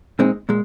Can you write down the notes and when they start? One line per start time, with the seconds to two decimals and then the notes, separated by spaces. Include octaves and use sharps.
0.19 A#2 G#3 C4 D#4
0.49 A#2 G#3